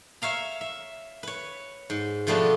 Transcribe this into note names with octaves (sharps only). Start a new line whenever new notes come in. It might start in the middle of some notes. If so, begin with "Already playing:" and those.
C#5 E5 F5 A#5
E5
B4 C#5
G#2
B2 F3 A3 B3 D4